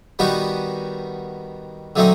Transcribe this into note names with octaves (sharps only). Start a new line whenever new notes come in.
D#3 G3 B3 D#4 F#4
D3 F#3 A3 C4 D#4